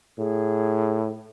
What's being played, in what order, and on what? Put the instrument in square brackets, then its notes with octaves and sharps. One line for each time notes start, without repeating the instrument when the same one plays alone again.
[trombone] A2 [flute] G#4